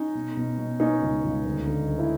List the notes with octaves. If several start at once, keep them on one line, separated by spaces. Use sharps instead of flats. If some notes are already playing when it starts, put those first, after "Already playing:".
Already playing: C#4 D#4
B2
B2
B2
B2 C#4 D#4
C#2
C#2
D2
D3
D2
E4